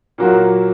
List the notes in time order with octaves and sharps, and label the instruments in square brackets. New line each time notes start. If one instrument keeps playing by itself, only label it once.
[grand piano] A#2 F#3 A#3 F#4